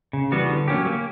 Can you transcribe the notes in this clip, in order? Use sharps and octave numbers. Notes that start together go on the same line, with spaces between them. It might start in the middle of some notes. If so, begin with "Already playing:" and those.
C#3
E3 G3 B3 F#4
D3
F#3 A#3 C#4 G4
A#3